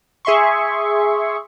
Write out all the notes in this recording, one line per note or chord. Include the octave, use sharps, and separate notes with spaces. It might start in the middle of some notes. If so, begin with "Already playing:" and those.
G#4 E5 C6 C#6